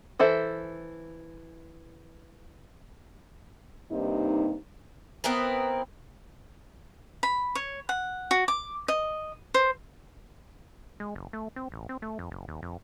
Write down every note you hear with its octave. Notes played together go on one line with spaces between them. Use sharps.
E3 A4 C5 E5
G2 C3 A#3 D#4
B3 C4 E4 A#4
B5
C#5
F#5
F#4
D6
D#5
C5
G#3
F#1
A3
C4
A1
C4
A3
F2
F#1
D#2
F2